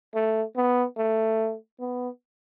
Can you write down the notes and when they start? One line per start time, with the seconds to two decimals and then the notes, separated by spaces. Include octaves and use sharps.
0.14 A3
0.56 B3
0.97 A3
1.80 B3